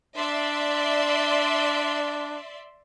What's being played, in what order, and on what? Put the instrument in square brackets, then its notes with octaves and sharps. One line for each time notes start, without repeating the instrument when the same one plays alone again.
[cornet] D4 [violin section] D5 E5 C6